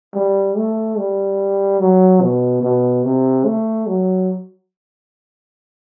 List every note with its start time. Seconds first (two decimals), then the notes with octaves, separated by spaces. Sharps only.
0.15 G3
0.57 A3
0.98 G3
1.80 F#3
2.22 B2
2.63 B2
3.04 C3
3.46 A3
3.87 F#3